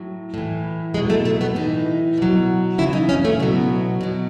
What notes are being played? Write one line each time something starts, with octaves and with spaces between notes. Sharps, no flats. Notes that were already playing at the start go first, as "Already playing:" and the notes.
Already playing: A2 F#3
A2 E3
B2 F#3 G#3
A3
A3
B3
A2 E3 D#4
B2 F#3
C#3 E3 E4
D#4
C#4
A3
B2 F#3 B3
B2 F#3